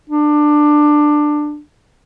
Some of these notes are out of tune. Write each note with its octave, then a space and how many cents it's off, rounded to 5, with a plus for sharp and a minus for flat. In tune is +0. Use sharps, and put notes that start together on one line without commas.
D4 +15